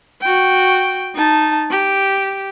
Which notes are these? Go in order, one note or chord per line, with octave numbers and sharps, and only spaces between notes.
F#4 G5
D#4 A5
G4